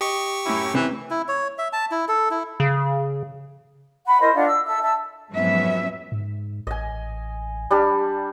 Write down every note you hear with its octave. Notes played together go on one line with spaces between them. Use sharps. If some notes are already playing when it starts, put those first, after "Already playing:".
G4 D#5 C#6
F#2 A2 E4
C3 E3
E4
C#5
E5
A5
E4
A4
E4
C#3
F#5 B5
E4 A#4 C5 D#5
D4 F4 F#5
E6
A4 E5 E6
E5 A5 E6
F2 G#2 F#3 B3 C#4 E5
G#2
A1 D#5 G#5
G3 D4 G4